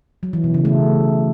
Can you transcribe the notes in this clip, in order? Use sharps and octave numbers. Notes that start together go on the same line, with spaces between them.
F#3
E3
B2
C#3
A3